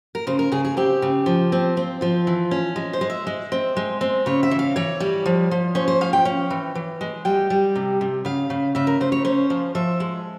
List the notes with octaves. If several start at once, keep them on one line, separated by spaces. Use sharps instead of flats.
A#4
C#3 C5
A#4
C#3 G#4
G#4
C4 G4
C#3
F3
C4
C4 F4
F3 F4
E3
C#4
G#3
C5
G#3
E5
G#3
C4
G#3
C4
C#3 C#5
E5
E3
F5
E3 C#5
G3
F3
F3
C#4 C5
C5
F3 F5
G5
C#4
E3
E3
G#3
G3 G5
G3
C3
C3
C#3 F5
C#3
C#3 E5
A#4
C#3 C5
C#5
C#4 C5
F3
F3 E5
G#3